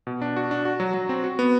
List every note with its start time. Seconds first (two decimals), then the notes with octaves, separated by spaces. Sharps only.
0.07 B2
0.22 D4
0.36 F#4
0.51 D4
0.65 F#4
0.80 F#3
0.94 F#3
1.09 C4
1.24 F#4
1.39 B3